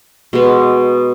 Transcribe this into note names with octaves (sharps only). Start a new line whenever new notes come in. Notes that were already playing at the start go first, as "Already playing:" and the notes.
B2 G#3 B3